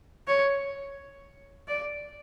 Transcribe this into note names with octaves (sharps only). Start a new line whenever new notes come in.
C#5
D5